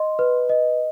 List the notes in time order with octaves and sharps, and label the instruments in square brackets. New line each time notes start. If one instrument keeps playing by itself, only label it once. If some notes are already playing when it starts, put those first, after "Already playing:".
Already playing: [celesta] D#5 C6
B4
D#5